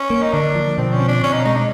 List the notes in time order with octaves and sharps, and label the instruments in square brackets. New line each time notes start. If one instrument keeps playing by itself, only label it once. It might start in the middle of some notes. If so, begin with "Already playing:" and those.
Already playing: [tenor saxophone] C#4
[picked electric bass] A#3
[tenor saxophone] D#4
[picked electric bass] D3 [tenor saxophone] D4
[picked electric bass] F3
[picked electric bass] B2 [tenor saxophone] C4
[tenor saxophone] C#4
[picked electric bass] C4
[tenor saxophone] D4
[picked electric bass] B2 [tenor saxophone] C#4
[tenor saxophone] D#4
[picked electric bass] G#3 [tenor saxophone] D#4
[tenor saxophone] D4